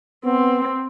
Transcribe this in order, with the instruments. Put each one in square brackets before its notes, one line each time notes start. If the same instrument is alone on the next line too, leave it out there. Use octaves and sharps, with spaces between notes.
[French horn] B3 [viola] C4